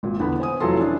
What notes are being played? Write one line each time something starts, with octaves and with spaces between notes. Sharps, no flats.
G#1 A#2
E2 D3 B3 B5
C5 G#5 D#6
F1 E3 F#3 F4 A4 C6
C#4 D4 E4